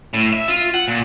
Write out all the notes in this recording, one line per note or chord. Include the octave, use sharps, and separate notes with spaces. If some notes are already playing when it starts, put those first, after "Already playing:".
A2
E5
F4
F#5
A#2